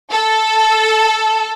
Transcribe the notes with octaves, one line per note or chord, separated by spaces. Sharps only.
A4